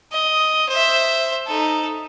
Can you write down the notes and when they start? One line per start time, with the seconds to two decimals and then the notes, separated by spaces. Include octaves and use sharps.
0.12 D#5
0.70 C5 E5
1.47 D#4 A4